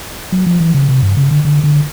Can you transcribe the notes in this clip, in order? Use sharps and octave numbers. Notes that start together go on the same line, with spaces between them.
F#3
F3
E3
C#3
C3
G2
C#3
D3
D3
D3